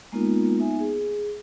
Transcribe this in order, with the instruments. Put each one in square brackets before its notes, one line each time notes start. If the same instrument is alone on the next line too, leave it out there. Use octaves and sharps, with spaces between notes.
[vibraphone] G#3 A#3 B3 D#4 F4 A#4
B3 D#4 E5 G#5
G#4